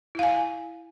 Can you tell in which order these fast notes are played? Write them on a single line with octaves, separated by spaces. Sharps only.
E4 F5 G#5